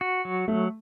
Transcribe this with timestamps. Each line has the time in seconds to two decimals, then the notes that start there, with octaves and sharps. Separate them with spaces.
0.01 F#4
0.25 F#3
0.48 F#3 A3